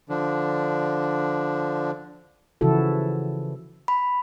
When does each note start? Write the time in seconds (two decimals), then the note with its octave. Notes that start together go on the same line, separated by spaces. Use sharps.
0.09 D3 F3 D4
2.61 C#3 E3 F3 E4 F#4 A4
3.88 B5